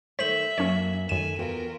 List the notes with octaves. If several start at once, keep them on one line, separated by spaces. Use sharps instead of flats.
D#3 A3 C5 E5 B6 F#7
F#2 A#3 C#4 C#5 G#5
F#2 D#3 A3 G#5 D#7 E7
E2 F4 F#4 A#4 G5